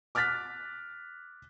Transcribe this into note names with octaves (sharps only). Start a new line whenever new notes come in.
D6 F6 F#6 A6 B6